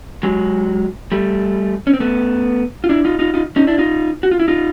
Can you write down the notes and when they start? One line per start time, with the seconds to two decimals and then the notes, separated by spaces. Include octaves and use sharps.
0.23 F#3 G#3
1.12 G3 A3
1.87 C#4
1.94 C4
2.00 A3 B3
2.84 F4
2.89 D4 E4
3.05 D#4 F4
3.19 D#4 F4
3.34 D#4 F4
3.56 C#4 D#4
3.67 D4 E4
3.78 D#4 F4
4.23 F#4
4.31 F4
4.40 E4
4.48 D#4 F4